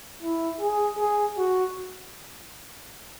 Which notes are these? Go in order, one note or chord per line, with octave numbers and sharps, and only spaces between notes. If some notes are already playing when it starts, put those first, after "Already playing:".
E4
G#4
G#4
F#4